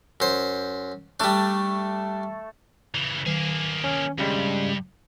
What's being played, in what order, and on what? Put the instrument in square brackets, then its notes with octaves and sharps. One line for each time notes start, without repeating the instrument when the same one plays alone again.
[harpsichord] F#2 C5
[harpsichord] G3 D4 [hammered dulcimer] A3 A4
[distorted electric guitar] C#3 E3
[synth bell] D#3 [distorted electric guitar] A#3 G#4
[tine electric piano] C#4
[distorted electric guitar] G2 [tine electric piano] C#3 G3 G#3